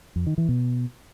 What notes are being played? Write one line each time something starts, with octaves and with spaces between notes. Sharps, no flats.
F2
D#3
E3
B2